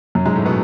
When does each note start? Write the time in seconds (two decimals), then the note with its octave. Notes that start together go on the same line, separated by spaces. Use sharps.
0.15 F#2 F#3
0.26 G#2 G#3
0.35 A2 A3
0.46 B2 B3